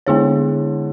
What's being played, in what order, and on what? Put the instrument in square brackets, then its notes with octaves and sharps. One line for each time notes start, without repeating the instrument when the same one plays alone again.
[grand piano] D3 [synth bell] G#3 B3 E4 G#4 C#5